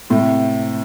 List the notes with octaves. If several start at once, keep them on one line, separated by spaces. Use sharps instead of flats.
A2 C3